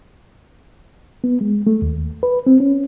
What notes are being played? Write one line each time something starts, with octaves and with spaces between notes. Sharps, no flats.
B3
G#3
A3
D#2
B4
C4
C#4